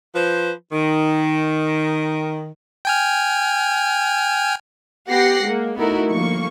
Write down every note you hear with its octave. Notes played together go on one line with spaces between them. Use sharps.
F3 B4 C5
D#3
G5 G#5 F6
B3 G4 F#5 G5 A#6 C7
G#3 A#3
A3 B3 D#4 E4 F#4 A#4
G1 F3 A#3 C#6